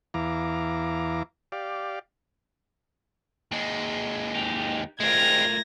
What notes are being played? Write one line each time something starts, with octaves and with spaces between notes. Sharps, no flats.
E2 E3 F5 A#5 D6
G4 D5 F5
D#2 G#3
D#4 G4
G#3 A3 C4 F4 A#4 G#6 A#6